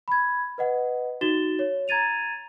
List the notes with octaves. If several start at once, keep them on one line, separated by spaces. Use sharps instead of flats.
B5 G#6
B4 D#5 F#5
D#4 F#4 A6 E7 G7
C#5
A#5 G#6 A6 D#7 F7